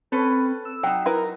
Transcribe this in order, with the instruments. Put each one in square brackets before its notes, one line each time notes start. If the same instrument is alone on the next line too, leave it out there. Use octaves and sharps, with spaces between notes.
[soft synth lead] C4 [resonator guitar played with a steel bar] C#4 A4 B4
[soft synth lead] E6
[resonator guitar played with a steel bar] F#3 D#4 [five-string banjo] G5
[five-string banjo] E4 A#4 B4 [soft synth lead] A#5